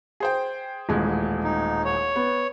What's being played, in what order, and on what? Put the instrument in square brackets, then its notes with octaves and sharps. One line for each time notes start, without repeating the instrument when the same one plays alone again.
[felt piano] G#4 C5 G5
D#1 A1 G#3
[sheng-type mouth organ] D#4
C#5
[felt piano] B3